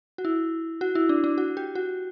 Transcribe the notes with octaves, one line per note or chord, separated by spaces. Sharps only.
F#4
E4
F#4
E4
D4
D4
F#4
G4
F#4